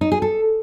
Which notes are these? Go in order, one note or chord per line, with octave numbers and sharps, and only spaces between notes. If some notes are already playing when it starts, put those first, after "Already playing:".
D#4
G#4
A4